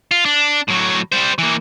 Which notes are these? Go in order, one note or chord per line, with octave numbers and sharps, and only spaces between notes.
F4
D4
A2 F#3
G3 C5
E3 A#3